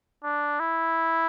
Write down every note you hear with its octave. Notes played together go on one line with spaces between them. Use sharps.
D4
E4